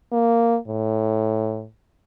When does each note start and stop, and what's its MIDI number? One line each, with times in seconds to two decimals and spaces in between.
0.12 0.58 58
0.67 1.66 45